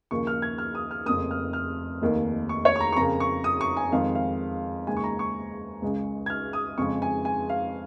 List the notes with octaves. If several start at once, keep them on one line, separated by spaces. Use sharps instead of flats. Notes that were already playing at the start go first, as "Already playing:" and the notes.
D#2 C#3 F3 A#3 C#6
F6
G#6
F6
D#6
F6
F1 F2 C#3 A#3 D#6
F6
F6
F1 D#2 D#3 A#3
C#6
C#5
C#6
A#5
C#6
F2 C#3 A#3 A#5
C#6
D#6
C#6
G#5
F2 D#3 G#3 F5
F5
D#2 C#3 G#3 G#5
C#6
A#5
C#6
C#2 C#3 G#3
G#6
F6
D#6
F2 C#3 G#3 C#6
G#5
G#5
F5